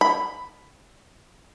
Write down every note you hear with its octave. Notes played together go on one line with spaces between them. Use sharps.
B5